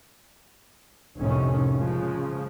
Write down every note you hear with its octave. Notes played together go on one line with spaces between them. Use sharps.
F1 C2 A2 C3 D#3 C#4
C#3 F3 G#3